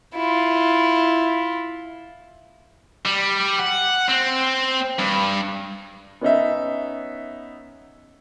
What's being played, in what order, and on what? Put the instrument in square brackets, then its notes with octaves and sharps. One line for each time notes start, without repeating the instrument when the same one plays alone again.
[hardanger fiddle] E4 F4
[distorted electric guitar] G3
F#5
C4
G2
[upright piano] B3 C#4 D#4 E5